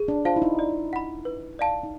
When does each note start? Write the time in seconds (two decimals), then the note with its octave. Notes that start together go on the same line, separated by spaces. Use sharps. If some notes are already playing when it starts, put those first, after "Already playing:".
Already playing: G#4
0.08 D4
0.25 F4 C5 F5 A5
0.36 E4
0.42 D#4
0.59 D5
0.93 F#5 B5
1.25 B4
1.59 D5 F5 A5
1.83 D#4